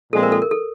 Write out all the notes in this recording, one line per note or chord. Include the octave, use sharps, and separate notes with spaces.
A#2 F3 G#3 C4 A4
A#4
A4
A#4
A4